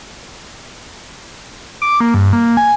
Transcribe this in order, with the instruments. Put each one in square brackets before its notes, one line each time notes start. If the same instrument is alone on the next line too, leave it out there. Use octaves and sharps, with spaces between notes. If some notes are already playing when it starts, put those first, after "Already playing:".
[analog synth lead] D6
A#3
G2
A#3
G#5